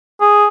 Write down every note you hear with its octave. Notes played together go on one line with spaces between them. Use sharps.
G#4